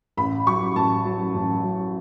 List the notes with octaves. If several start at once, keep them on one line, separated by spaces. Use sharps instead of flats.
A1 B5
F#3 C#6
A1 A5
F#3
A1
F#3